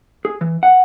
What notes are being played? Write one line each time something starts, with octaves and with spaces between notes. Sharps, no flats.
G#4
E3
F#5